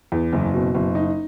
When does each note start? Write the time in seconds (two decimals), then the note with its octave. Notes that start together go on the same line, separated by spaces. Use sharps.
0.12 E2
0.33 F#1
0.54 B2
0.74 F#1
0.95 D#4